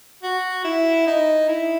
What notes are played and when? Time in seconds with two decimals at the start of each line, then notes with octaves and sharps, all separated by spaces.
0.23 F#4
0.64 E4
1.07 D#4
1.49 E4